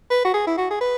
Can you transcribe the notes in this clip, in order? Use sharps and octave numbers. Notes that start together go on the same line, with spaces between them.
B4
F#4
G#4
E4
F#4
G#4
B4